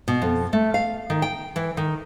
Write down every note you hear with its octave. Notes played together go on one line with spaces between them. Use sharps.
B2
F2
A3
F5
D#3
G5
E3
D#3